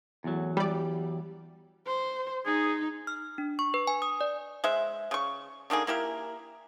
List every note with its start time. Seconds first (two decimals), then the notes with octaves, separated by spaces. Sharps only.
0.24 E2 A2 F#3
0.57 G3 G4 D5
1.87 C5
2.46 D#4 G#4
3.07 F6
3.38 D4
3.59 C#6
3.74 B4
3.87 G#5
4.02 D#6
4.21 D5
4.64 G#3 C5 E5
5.11 C#3 C#6
5.70 D3 D#3 A#3 G#4
5.87 A#3 E4 G4 A#4